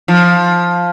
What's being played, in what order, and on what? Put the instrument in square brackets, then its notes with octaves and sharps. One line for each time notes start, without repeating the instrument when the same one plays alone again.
[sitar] F3